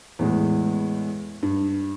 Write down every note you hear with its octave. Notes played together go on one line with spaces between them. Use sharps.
E2 A2 G#3
G2